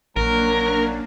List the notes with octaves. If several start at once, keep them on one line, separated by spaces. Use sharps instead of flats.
A#1 F#3 A#3 C#4 D4 A#4